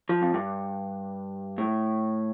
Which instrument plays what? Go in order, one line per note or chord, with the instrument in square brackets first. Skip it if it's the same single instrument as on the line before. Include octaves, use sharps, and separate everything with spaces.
[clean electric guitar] F3
F2
G2
A2